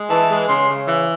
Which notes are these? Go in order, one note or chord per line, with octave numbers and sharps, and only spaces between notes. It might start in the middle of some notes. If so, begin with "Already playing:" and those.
Already playing: G#3
E3 A5
G#3
C#3 C6
C#3
E3